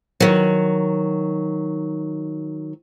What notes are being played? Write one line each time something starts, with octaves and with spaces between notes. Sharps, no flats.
D#3 F#3